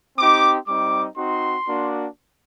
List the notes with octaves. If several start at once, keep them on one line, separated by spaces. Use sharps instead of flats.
C4 D#4 G4 D6
G3 C4 D#4 D6
C4 D#4 F#4 C6
A#3 D4 F#4